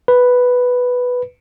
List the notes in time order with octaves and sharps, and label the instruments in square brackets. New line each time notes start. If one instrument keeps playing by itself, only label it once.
[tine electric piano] B4